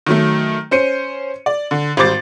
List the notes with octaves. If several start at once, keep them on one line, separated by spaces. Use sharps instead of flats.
D#3 F#3 A3
C#4 C5 C#7 D#7
D5
D3
G#1 G3 C5 D6 A6